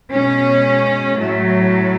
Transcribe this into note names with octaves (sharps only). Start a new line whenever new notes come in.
B2 G#3 C#4
A2 F#3 A3